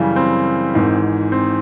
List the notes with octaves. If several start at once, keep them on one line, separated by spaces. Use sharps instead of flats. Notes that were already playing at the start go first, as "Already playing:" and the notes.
Already playing: F#2 C#3 E3 G3
C4
G#1 G#2 E3
C4